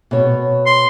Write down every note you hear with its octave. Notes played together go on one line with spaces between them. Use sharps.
B2 C#5
C6